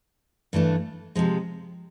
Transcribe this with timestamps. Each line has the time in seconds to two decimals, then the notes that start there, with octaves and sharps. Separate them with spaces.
0.53 G2 E3 A3 D4
1.15 C3 F3 G#3